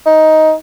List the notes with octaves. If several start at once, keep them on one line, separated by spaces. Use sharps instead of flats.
D#4